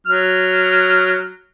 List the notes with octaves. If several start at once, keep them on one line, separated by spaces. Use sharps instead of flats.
F#3 F6